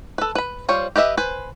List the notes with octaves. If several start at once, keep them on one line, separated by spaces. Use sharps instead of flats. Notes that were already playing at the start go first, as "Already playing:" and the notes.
A4 B4
B4 B5
G3 F4 C5 C#5
G4 B4 D#5 E5
B4 C5 G#5